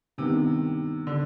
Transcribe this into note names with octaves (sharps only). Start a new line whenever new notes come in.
G2 C3 D#3 B3
D3